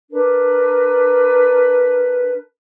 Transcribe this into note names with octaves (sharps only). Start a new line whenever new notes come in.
D4 A#4 B4